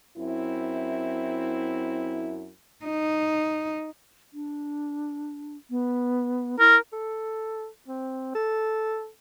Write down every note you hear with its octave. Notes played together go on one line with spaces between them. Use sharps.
F#2 C4 E4
D#4
D4
B3
E4 A#4
A4
C4
A4